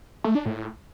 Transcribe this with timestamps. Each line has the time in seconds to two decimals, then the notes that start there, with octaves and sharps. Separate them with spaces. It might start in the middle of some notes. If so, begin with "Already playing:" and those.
0.24 A3
0.35 D4
0.46 A2